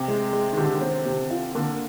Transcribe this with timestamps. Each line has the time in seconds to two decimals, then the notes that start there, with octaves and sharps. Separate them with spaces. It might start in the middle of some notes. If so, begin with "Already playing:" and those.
Already playing: C3
0.08 G#3
0.33 G#3
0.52 D#3
0.57 D3 G4
0.81 C4
1.06 C3
1.30 F4
1.55 D3 A#3